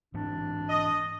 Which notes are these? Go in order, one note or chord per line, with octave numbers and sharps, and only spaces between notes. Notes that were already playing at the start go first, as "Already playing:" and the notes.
G#2 E3 C4 D4
D#5